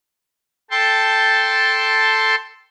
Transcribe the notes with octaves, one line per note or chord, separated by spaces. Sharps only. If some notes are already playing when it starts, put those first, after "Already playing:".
A4 G5 A5 C6